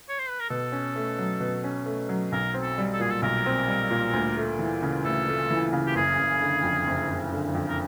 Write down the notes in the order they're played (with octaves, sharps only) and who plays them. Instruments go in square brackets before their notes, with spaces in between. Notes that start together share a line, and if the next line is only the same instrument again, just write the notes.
[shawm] C#5
C5
B4
A#4
[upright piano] B2 [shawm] A4
[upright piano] C#4
A3
F#3
B2
C#4
A3
F#3
[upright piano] B1 [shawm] A#4
[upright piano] C4
[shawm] A4
[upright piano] G3
[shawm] A4
[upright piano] A#2 [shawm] G#4
[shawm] A4
[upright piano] B1 [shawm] A#4
[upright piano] C4
G3
A#2
D2
A3
E3
C#3
[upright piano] D2 [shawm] A4
[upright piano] A3
E3
C#3
[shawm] G4
[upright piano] F#1 [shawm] G#4
[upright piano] F#1
D3
F2
F#1
F#1
D3
F2
[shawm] A#4